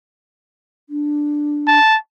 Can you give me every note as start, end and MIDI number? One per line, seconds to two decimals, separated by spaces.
0.90 1.79 62
1.68 1.97 81